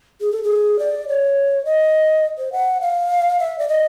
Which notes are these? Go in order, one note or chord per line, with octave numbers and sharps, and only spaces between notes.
G#4
A4
G#4
D5
C#5
D#5
C5
F#5
F5
E5
D5
D#5